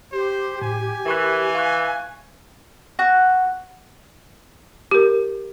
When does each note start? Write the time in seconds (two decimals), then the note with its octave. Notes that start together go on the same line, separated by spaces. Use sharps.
0.12 G4 C5
0.62 A2 G#5
1.06 E3 A#4 C#6 F#6
1.55 F5 C#6 F#6
2.99 F#4
4.91 G4 A#4